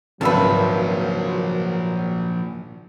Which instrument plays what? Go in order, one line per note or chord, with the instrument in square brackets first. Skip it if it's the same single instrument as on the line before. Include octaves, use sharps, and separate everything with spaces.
[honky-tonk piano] G#1 C#2 [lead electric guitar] F3 A#3 [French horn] F#3 [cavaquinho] B4 E5 A5